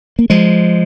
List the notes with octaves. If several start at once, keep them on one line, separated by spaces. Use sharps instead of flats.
A#3
F3 G#3